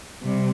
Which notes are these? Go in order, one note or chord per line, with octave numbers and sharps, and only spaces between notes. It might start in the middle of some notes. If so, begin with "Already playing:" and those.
C3 G3